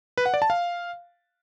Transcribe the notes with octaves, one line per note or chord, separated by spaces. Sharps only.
B4
F#5
D5
A5
F5